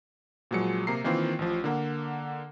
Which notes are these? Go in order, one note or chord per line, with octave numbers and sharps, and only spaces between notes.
A#2 F3 F#3 G#3 C#7
C3 A#3 A#5 C7
D#3 E3 A#3 C4 F4
A1 F3
D3 A#3 F#5